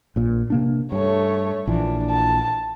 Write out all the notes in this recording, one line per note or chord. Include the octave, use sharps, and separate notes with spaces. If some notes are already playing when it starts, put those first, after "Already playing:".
A#1 A#2
C3 A#3 D4
G2 A3 C#5
A#1 E3 F3 D4
A5